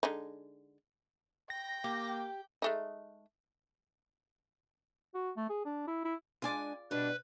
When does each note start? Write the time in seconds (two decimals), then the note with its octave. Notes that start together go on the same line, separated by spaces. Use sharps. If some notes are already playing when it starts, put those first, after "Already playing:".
0.03 D3 G#3 D#4
1.50 G5 A#6
1.84 A#3 G4
2.62 G#3 A3 D#4
5.14 F#4
5.37 A3
5.49 G#4
5.65 D4
5.87 E4
6.05 E4
6.42 G#3 D4 F4 G#4 D5 G#5
6.91 B2 G3 D4 B4